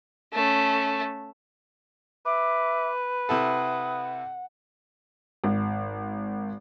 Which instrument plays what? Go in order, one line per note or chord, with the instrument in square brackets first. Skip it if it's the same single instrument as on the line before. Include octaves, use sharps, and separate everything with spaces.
[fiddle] A3 C#4
[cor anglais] B4 [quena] E5 [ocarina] D6
[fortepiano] C3 E4 A4 [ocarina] F#5 [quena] D#6
[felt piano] G#1